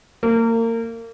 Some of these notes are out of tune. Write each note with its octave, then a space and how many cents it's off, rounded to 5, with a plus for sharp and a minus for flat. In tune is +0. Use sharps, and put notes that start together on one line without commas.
A#3 -30